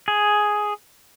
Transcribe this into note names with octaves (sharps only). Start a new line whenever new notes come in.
G#4